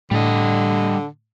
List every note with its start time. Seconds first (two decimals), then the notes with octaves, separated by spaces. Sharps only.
0.11 A2 D3 G3 D#5